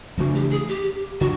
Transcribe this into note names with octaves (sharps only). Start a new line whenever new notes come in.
C#3 E3 A3 D4 F#4
G4
G#4
G4
D3 F#3 F#4